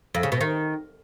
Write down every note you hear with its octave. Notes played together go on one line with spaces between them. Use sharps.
F2
C#3
B2
D#3